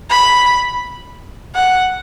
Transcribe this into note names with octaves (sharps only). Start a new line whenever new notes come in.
B5
F#5